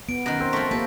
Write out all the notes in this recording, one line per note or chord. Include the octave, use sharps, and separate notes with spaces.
B3 D7
F#2 D#3 F#6 A#6
C4 A#4
F3 A3 C6 C#6 B6
A#3 G4 B4 C5